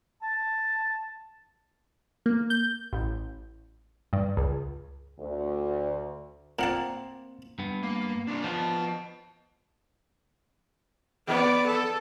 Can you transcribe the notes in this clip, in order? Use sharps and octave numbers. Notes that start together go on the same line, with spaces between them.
A5
A#3
G6
A1
G2
C#2
D2
A#2 A#3 C4 A#4 F#5 A5
G2 B3
A#3
D4 F4
F3 B3 D#5 A5
B3 D5
A4